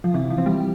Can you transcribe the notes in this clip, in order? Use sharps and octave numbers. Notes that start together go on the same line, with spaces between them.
F3
C3 E3
F3
C4
G3